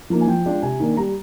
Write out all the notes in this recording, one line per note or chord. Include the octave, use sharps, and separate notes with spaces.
F3 A#3 D#4
G#5
F3 G5
G#3 D4 F4
C3 G#5
D#3 A#3 D4
G3 A#5